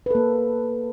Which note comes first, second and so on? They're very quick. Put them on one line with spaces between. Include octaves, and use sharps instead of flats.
B4 A4 A#3